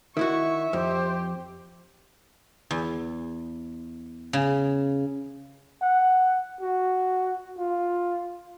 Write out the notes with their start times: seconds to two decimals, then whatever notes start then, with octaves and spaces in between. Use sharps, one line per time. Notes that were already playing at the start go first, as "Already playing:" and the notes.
0.17 D#3 E4 F#4 E5 C#6
0.73 F2 G4 C5
2.71 E2
4.33 C#3
5.81 F#5
6.61 F#4
7.58 F4